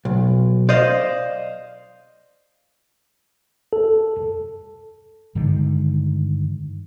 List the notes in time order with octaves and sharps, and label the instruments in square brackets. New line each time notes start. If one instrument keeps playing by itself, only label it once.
[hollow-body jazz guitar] B1
[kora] C5 D#5 F5 [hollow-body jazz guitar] D5
[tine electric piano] A4
[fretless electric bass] G2 D3 D#3 G#3